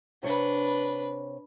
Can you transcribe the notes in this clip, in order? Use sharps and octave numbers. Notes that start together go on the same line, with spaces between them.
C3 D4 B4 C#5